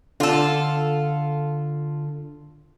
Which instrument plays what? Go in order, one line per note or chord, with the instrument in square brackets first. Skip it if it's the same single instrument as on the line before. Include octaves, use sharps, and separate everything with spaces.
[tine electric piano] D3 [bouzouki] F4 A4